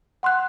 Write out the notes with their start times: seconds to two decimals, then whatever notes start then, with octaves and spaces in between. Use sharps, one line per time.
0.23 F#5 C6 F#6